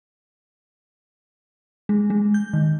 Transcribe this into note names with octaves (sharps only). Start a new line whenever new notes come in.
G#3
G#3
G6
D#3